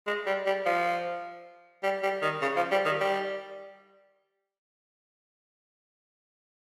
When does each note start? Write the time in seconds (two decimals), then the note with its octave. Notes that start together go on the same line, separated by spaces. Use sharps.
0.07 G#3
0.27 G3
0.46 G3
0.66 F3
1.83 G3
2.03 G3
2.22 D#3
2.42 C#3
2.57 F3
2.71 G3
2.85 D#3
3.00 G3